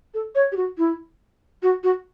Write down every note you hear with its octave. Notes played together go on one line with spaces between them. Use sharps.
A4
C#5
G4
F#4
E4
F#4
F#4